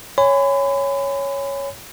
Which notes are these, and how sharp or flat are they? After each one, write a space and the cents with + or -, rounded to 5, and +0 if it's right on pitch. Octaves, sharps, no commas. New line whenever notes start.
C#5 +0 G#5 -15 B5 +35